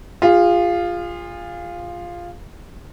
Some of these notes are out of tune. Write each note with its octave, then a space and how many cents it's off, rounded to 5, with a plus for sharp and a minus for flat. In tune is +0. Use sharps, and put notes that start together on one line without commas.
F4 +0 G#4 -35